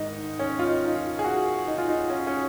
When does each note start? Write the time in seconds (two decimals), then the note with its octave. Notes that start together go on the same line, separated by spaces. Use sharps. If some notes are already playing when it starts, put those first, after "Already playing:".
Already playing: G#2 D#3 D#4
0.39 C#4
0.59 F4
0.67 D#4
0.86 D#4
0.96 F4
1.19 G#4
1.24 F#4
1.67 D#4
1.78 F4
1.88 D#4
2.10 C#4
2.27 C#4